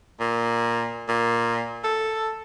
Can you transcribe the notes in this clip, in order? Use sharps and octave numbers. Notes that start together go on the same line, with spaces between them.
A#2
A#2
A4